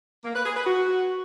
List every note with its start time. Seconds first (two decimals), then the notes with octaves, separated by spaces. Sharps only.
0.25 A#3
0.35 B4
0.46 G#4
0.56 B4
0.67 F#4